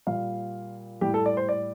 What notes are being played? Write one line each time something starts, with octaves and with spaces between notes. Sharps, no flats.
A#2 G3 F5
A2 G3 G4
A4
D5
C5
D5